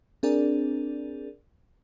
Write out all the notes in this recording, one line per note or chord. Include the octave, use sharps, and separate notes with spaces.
C4 D4 G#4 A#4 D5